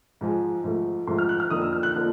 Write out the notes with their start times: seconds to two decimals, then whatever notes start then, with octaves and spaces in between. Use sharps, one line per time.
0.21 G#2 F3 G#3
0.64 G#2 F3 A3
1.07 G#2 F3 A3 C6
1.18 F6
1.29 F#6
1.40 F6
1.50 F2 D3 F3 A#3 D#4 D#6
1.62 E6
1.73 F6
1.83 F#6
1.94 D3 F3 A#3 D#4